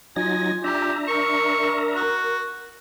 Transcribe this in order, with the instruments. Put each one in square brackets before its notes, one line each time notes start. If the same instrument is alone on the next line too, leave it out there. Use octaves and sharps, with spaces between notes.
[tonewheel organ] F#3 D#4 A#6 [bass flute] F4 [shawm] G#5
[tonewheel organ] D4 E5 A#5 [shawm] G4
[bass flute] A#4 [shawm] C#6
[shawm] F#4